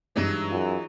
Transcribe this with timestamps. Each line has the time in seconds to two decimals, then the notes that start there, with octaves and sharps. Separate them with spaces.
0.16 G2 E3 F#3 G#3 D#4
0.51 F#2 F4 G#4